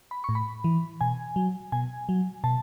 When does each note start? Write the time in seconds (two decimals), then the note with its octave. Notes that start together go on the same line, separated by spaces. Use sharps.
0.11 B5
0.24 A2 C#6
0.35 B5
0.64 E3
1.01 B2 G#5
1.36 F#3
1.72 B2 G#5
2.09 F#3
2.44 B2 A5